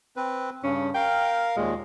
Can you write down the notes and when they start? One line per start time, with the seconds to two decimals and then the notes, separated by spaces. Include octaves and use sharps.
0.17 C4 B4
0.63 G2 C#3 C#4
0.95 A#4 F5 G5
1.56 D#2 A#2 G#3